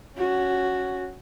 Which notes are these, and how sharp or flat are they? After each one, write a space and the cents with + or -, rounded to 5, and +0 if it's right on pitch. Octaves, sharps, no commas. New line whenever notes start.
C#4 +0 F#4 +0